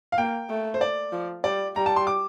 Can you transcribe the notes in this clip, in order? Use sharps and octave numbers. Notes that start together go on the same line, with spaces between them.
F5
A#3 G5
A3
C5
D5
F3
G3 D5
G3 A#5
A5
C6
D6